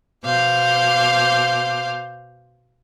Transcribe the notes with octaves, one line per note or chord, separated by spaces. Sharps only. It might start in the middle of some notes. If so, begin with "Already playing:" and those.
B2 C5 F5 D6